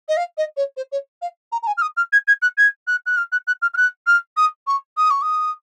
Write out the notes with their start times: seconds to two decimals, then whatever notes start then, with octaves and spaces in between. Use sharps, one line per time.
0.08 D#5
0.17 F5
0.37 D#5
0.57 C#5
0.77 C5
0.92 C#5
1.22 F5
1.52 A#5
1.62 A#5
1.67 G#5
1.77 F6
1.82 D#6
1.97 F6
2.12 G#6
2.28 G#6
2.42 F#6
2.58 G#6
2.87 F#6
3.06 F#6
3.17 F6
3.32 F#6
3.47 F#6
3.62 F6
3.74 F6
3.77 F#6
4.07 F6
4.37 D#6
4.67 C#6
4.97 D#6
5.10 C#6
5.22 D#6